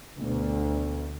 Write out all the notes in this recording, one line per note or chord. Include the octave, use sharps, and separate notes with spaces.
D2 B2